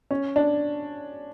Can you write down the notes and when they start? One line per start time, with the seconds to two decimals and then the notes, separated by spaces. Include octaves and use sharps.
0.11 C#4
0.36 D4